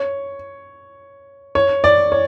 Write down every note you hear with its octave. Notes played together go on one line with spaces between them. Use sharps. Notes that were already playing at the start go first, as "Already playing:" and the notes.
Already playing: C#5
C#5
D5
C#5